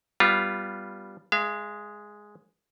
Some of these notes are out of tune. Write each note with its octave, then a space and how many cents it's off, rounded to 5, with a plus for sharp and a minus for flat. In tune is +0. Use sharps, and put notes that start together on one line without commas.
G3 +0 B3 +0 F4 +0
G#3 +0 F5 -40